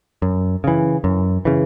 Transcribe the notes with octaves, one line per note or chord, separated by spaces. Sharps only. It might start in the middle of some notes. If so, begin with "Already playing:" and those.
F#2
C#3 E3
F#2
C#3 E3